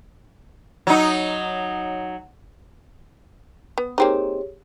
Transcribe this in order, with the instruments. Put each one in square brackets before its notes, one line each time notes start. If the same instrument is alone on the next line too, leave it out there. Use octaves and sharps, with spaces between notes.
[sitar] F#3 D#4
[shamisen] B3
[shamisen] A#3 C4 D#4 [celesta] G4 G#4 C#5